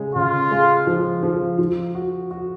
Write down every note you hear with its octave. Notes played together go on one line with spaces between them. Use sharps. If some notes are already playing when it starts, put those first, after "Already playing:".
Already playing: C#3 G#3
C#3 F4
G#3
F3
F3
F3
F#4
F#4